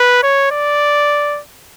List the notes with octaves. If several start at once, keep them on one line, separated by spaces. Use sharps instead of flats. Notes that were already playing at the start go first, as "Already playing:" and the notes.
Already playing: B4
C#5
D5